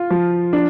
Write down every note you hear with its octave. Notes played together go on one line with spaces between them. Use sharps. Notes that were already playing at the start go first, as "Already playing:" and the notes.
Already playing: F4
F3
D4